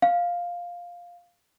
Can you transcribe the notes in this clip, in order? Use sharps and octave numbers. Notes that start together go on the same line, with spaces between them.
F5